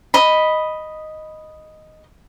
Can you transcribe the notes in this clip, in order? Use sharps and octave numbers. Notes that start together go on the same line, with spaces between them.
D#5 B5